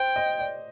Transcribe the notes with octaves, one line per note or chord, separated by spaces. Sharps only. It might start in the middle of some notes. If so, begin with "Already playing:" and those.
Already playing: C5 G5
D#5
D5